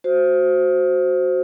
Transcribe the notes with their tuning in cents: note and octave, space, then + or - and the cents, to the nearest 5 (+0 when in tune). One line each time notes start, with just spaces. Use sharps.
F#4 +0 C5 +0